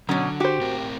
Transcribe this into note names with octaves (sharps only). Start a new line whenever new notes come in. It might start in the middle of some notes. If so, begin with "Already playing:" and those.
B2 D3 F#3 C#4
F#4 G4 C5
A2 C4 A#4